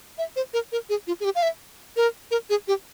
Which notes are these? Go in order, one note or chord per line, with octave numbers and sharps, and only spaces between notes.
E5
C5
A#4
A#4
G#4
F4
G#4
G4
F5
E5
A#4
A#4
G#4
G4